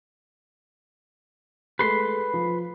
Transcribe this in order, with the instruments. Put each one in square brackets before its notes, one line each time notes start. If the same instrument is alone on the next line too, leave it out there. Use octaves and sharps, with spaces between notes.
[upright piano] G#3 A3 [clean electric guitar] B4 C6
[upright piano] F3